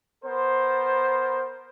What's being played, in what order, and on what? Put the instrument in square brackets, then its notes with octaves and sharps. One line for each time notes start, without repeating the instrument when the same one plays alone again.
[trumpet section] B3 A#4 C5